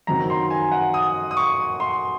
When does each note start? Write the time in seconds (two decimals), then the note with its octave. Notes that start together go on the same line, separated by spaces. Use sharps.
0.07 F#2 D#3 F#3 C4 A#5
0.30 C6
0.50 G#5
0.72 F#5
0.94 D#6
1.31 D#6
1.37 C#6
1.80 C6